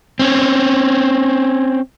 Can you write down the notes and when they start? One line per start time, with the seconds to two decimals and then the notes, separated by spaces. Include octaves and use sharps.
0.19 C4 C#4